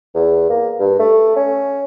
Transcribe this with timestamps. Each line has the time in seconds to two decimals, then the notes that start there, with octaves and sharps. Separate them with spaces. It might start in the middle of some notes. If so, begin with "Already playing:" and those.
0.15 E2
0.49 A#3
0.79 G2
0.99 A3
1.36 C#4